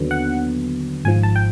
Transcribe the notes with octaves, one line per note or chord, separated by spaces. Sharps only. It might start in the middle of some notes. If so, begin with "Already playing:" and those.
Already playing: D#2 D3 F#3 B3
F#5
G#1 G#2 F3 G#5
A5
G5